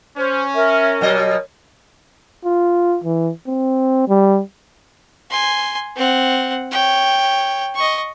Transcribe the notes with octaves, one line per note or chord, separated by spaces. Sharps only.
C#4 C5
A#4 E5
B2 F#3 C#5 D#5
F4
E3
C4
G3
G#5 C6
C4 F#5
C#5 G5
D#5 C#6